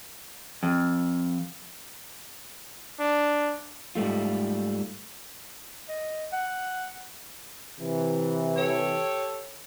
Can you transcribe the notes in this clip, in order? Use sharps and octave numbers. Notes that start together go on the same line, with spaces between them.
F2
D4
G#2 G3 A3 F4
D#5
F#5
C3 E3
G4 A4 C#5